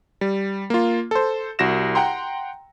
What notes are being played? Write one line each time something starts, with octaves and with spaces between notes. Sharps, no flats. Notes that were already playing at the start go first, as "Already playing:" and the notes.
G3
A#3 F4
A4 C5
C2 F#4 A#6 E7
F#5 G5 A#5 C6